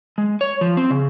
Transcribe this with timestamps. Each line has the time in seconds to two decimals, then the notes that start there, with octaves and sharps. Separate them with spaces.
0.18 G#3
0.41 C#5
0.61 F3
0.77 C4
0.91 C#3